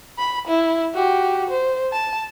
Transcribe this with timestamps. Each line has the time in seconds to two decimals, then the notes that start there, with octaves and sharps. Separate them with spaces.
0.18 B5
0.47 E4
0.94 F#4 G4
1.50 C5
1.92 A5